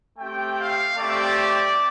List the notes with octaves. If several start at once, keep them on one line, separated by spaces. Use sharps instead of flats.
A3 C4 G4 G5
F5
A3 C4 G4 D5